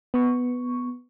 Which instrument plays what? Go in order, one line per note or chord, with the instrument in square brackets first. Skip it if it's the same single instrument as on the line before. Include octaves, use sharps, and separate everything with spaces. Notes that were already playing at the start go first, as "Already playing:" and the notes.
[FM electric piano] B3 C#6